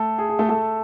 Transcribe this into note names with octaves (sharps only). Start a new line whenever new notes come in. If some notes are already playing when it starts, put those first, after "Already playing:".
Already playing: A3 A4
G#4
G#4
A3 A4
A3 A4